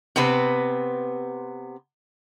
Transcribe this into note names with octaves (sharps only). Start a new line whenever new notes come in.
C3 B3 C4 B4